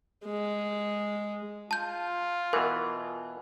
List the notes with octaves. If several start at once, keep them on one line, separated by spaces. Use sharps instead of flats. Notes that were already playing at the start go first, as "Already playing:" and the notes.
G#3
F4 A5 G6
B2 E3 A#4